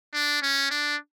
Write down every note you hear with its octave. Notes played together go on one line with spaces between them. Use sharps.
D4
C#4
D4